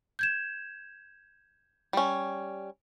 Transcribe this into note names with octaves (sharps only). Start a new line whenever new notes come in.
G6 G#6 E7
G3 C#4